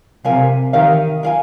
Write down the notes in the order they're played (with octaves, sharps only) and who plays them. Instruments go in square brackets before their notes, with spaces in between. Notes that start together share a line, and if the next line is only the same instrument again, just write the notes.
[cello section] C3 [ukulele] A#4 F5 G#5
[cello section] D#3 [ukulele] G4 A#4 F5
[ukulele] A#4 F5 G#5